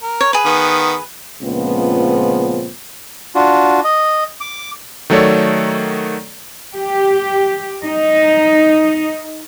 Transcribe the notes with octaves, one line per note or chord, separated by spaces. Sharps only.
A#4
C#5
G#4 B4
D#3 B3
C#2 A#2 C#3 F3 B3 C4
D4 F4 F#4
D#5
D6
D#3 F#3 A3 A4 C#5 D5
G4
D#4